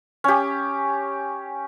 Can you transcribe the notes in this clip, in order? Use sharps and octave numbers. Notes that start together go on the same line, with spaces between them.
C#4 G4